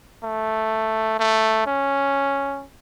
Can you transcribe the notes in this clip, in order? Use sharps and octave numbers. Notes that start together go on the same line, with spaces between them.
A3
A3
C#4